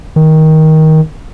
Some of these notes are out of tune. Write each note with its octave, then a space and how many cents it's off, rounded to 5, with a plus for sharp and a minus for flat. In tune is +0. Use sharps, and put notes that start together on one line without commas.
D#3 +15